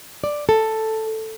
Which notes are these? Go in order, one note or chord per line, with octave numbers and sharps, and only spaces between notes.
D5
A4